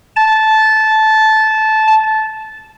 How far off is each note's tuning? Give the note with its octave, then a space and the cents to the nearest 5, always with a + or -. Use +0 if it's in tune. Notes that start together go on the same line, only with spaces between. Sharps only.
A5 -15